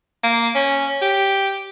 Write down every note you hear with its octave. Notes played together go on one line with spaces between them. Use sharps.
A#3
C#4
G4